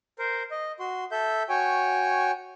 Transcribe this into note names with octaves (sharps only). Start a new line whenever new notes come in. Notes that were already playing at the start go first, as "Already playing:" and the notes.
A#4 C5
D#5
F#4 C6
A4 E5 G6
F#4 C#5 G5 G#5